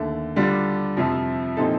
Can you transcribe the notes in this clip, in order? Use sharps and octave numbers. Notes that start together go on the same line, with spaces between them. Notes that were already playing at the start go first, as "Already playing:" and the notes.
Already playing: D#2 D3 A3
D3 G3 D4 F4
F2 C3 F3
A#2 F3 C4 D#4 A4